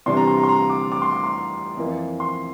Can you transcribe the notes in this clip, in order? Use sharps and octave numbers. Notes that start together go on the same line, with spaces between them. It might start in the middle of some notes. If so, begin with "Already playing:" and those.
C3 E3 G3 D4 C6
A#5
C6
A#5
C6
A#5
D6
D6
C6
D6
C6
F2 E3 A#3
C6